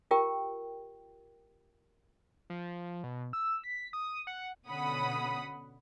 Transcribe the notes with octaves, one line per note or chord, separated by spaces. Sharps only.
F4 G4 A#4 G5
F3
B2
E6
B6
D#6
F#5
B2 D3 C#4 F#5 B5 D#6